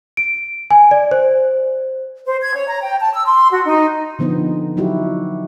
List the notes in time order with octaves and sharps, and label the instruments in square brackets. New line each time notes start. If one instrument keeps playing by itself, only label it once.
[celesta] D7
G#5
D5
C5
[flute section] C5
G#6
C#5
A#5
G5
A5
E6
C6
F#4
D#4
[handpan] D3 F3 B3 D#4 C5
F#3 D#4 E4 F#4 G4